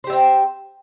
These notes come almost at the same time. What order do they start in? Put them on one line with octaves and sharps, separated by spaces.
C5 G4 E5 C4